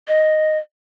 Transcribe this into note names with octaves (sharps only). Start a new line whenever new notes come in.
D#5